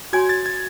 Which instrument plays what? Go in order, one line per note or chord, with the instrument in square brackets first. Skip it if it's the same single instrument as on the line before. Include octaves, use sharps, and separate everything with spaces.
[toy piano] F#4 C#5 G#5 C6 [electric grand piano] G#6
[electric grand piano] A6
G#6